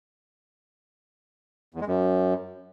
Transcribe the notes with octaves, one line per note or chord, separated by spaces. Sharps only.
E2
G#3
F#2